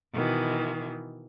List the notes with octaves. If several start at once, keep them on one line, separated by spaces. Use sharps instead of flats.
B2 D#3 E3